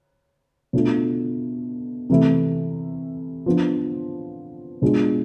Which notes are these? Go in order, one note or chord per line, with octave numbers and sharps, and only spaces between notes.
B2 A3 D4 F4
C3 E3 A3 E4
F3 B3 D4
B2 G#3 D4 F4